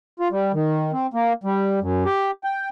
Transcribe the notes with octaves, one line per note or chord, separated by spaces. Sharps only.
F4
G3
D#3
C4
A#3
G3
F#2
G4
G5